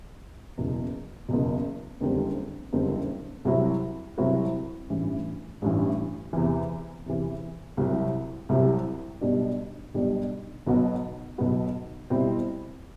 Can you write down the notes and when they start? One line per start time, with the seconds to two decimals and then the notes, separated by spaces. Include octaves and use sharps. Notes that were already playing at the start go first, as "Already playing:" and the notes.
0.58 F#1 E2 B2
1.28 F#1 E2 B2
2.01 F#1 E2 D3 G3 C4
2.73 F#1 E2 D3 G3 C4
3.45 C2 C3 F#3 C4 E4
4.18 C2 C3 F#3 C4 E4
4.90 A1 G2 E3
5.62 A1 G2 E3
6.33 E2 C3 E3
7.06 E2 C3 E3
7.77 C2 C3 F#3
8.49 C2 C3 F#3
9.21 B1 B2 G3 D4
9.94 B1 B2 G3 D4
10.67 B1 B2 F#3 B3 F#4
11.38 B1 B2 F#3 B3 F#4
12.10 B2 G3 C4 E4